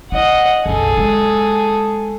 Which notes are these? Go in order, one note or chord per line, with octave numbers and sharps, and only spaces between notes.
E4 D#5 F#5
F#1 B1 G#4 A4
G#3